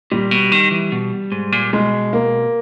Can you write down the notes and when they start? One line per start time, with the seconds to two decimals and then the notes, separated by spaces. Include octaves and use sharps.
0.11 A#2 G3
0.31 B2
0.52 D#3
0.71 E3
0.92 B2
1.32 G#2
1.52 A#2
1.73 B2 G#3
2.13 A#3